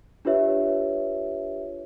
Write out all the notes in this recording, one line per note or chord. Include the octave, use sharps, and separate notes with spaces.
D4 F4 G4 B4 C#5 E5